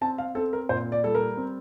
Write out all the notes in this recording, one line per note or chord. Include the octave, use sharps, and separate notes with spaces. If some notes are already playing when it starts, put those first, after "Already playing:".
C4 A5
F5
C4 A4
A#4
A#2 C5
D5
G3 A4
A#4
C4